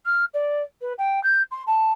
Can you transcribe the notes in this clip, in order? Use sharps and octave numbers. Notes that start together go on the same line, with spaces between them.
F6
D5
B4
G5
G6
C6
A5